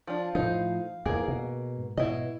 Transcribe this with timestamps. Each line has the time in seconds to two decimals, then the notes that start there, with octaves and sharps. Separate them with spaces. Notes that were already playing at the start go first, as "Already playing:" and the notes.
0.07 F3 D4 F5
0.35 A2 F3 D#4 C5
1.06 E2 G#2 A#3 G#4 A#4
1.28 B2
1.77 G#2
1.97 B2 E4 D#5